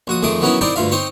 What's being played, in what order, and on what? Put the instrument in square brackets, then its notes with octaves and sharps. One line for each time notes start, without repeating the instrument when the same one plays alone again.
[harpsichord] A#1 F#4 D#6
F2 G#2 D#3 A3 D6 D#6
D#3 F#3 B3 C#4 D#4 E4
C4 D#4 E4 A#4 C5 D5
D2 G2 F4 E5 F5
C4 D#4 C5 C#5 C6